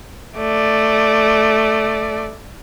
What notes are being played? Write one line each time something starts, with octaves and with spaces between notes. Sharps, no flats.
A3 D5